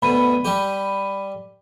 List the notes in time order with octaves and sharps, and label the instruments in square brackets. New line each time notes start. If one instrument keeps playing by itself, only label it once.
[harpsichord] D2 B2 [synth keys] B5 D#7
[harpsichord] G3 G4